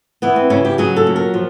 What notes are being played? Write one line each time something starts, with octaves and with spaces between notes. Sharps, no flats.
E3 B3
C4
C#3 C#4
G4
F#3 G#4
A4
A#2
A#4
F3